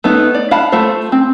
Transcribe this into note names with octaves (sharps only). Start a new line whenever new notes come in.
A3 B3 D#4
D5
F5 F#5 A5 B5
A3 F4 C5
C4